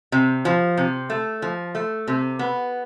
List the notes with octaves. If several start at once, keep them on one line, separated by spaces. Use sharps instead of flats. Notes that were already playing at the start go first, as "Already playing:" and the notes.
C3
F3
C3
A3
F3
A3
C3
B3